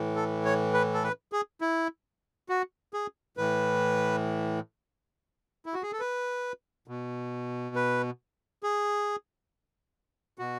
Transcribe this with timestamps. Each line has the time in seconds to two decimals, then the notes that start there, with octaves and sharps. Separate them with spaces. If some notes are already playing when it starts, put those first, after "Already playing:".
Already playing: A2 E3
0.16 A4
0.45 C#5
0.74 B4
0.94 A4
1.03 B4
1.32 G#4
1.61 E4
2.49 F#4
2.94 G#4
3.37 A2 E3 B4
5.66 E4
5.74 F#4
5.83 G#4
5.92 A4
6.00 B4
6.88 B2
7.76 B4
8.63 G#4
10.39 B2 F#4